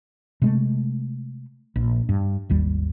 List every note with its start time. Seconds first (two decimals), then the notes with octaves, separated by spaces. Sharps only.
0.42 C3 G#3 A3
1.76 A#1
2.09 G2
2.49 G#1 D#2 G3